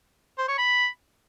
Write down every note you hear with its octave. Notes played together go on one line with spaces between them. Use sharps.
C5
C#5
B5